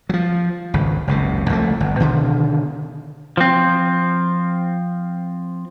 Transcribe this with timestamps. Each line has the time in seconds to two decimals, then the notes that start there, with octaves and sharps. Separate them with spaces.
0.09 F3 F#3
0.74 G#1 C#2
1.07 F#1 C#2 C3
1.50 C2 F3 G3 A3
1.80 G1
2.00 B2 D3 D#3
3.37 F3 C4